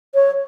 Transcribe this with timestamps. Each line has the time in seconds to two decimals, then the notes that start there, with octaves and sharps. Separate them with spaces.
0.15 C#5